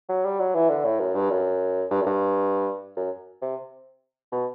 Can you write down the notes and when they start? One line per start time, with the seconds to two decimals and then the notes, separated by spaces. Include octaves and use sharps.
0.09 F#3
0.25 G3
0.40 F#3
0.55 E3
0.69 D3
0.84 A2
1.00 F#2
1.15 G2
1.30 F#2
1.91 G2
2.01 F#2
2.06 G2
2.96 F#2
3.42 C3
4.32 B2